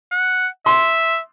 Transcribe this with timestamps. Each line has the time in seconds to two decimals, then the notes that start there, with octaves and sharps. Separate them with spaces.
0.12 F#5
0.66 E5 C6